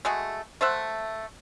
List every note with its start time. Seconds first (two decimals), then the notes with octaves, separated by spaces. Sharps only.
0.05 G#3 A3 F#4 G#4
0.61 A3 C5 E5 F#5